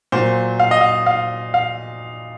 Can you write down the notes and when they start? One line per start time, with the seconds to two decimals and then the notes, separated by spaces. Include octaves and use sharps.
0.12 A#2 F#3 C5
0.60 F5
0.71 D#5
0.81 F5
1.06 F5
1.54 F5